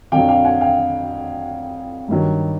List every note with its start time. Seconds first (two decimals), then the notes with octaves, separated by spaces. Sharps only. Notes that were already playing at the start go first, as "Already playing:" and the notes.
0.12 F2 D3 F#3 F5 G5
0.29 F5 G5
0.45 F#5 G#5
0.61 F5 G5
2.08 G2 D#3 F#3